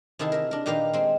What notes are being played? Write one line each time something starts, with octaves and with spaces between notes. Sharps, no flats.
C3 D#3 E4 G#4 A5
A#4 E5
D4 A#4
A#2 D#3 G4 A#4 B4 F5
G#3 C4